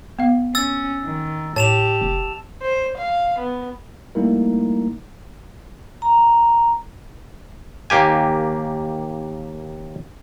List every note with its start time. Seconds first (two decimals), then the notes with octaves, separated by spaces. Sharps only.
0.19 B3 F5
0.55 C#4 E6 A6
1.04 D#3
1.56 A2 G4 C#5 A5 E7 F7
2.01 F1
2.61 C5
2.96 F5
3.39 B3
4.15 G3 A3 A#3 D#4 E4 A#4
6.02 A#5
7.90 D#2 A#3 G4 G#5